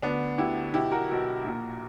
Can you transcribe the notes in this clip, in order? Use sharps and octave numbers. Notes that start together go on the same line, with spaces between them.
D2 D3 B3 D4
D2 D3 E4 G4
B1 B2 E4 G4
F#4 A#4
B1 B2
A#1 A#2